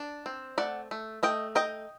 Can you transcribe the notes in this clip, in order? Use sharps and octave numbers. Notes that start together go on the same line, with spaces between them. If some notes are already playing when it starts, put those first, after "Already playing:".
Already playing: D4
C4
A3 D5 F#5
A3
A3 D#5 G5
D#4 D#5 G5